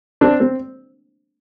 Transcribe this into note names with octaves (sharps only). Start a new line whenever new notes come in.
C4 D4
C4